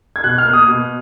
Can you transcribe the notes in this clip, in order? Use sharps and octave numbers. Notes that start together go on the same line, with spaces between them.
G#6
B2 F#6
F6
A#3
D#6
B2